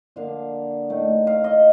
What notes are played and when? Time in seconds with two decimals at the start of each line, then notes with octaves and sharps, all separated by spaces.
0.16 D3 F3 A#3 D4 F5
0.90 A2 A3 D#4
1.27 F5
1.44 D#5